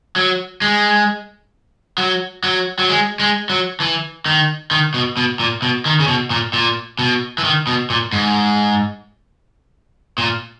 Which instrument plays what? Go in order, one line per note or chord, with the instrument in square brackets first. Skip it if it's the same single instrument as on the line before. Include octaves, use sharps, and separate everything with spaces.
[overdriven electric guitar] F#3
G#3
F#3
F#3
F#3
G#3
G#3
F#3
E3
D#3
D#3
B2
B2
A#2
B2
D#3
C#3
B2
A#2
A#2
B2
E3
D#3
B2
A#2
G#2
A#2